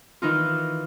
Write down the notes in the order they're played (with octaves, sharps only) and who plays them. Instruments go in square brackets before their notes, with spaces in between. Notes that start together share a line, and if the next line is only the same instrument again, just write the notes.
[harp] D#3 E3 D#4 F4